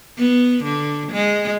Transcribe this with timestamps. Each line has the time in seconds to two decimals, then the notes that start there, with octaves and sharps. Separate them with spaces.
0.18 B3
0.64 D3
1.12 G#3